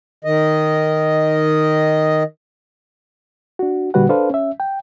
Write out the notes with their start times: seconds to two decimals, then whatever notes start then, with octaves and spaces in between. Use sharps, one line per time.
0.24 D#3 D#5
3.59 D4 F#4
3.94 A#2 D3 G3 F#4 B4 F#5
4.09 D4 A4 B4 C5 F5
4.30 C#4 E5
4.60 G5